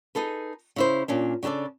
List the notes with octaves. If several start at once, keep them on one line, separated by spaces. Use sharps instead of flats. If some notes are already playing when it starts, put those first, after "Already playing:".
D#4 G#4 A4 B4
C#3 E4 C5
A#2 C#4 D4
C#3 D4 G4 A4 D5